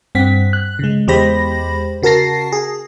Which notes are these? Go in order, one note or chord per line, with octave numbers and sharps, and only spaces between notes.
G2 C4 F#5 B6
F#6
C#3 G#3
E2 G#3 G4 C5 B5 A#6
C#3 F#4 A#4 A5 A#6 C7
G#4